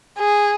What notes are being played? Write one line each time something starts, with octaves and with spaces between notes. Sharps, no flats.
G#4